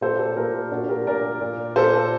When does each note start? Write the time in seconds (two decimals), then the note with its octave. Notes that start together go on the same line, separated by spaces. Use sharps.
0.01 A#2 A4 C5
0.19 A4 C5
0.37 A#2 G4 A#4
0.71 A#2 D4 F#4
0.89 G4 A#4
1.07 A#2 A#4 D5
1.41 A#2
1.76 A#2 A4 C5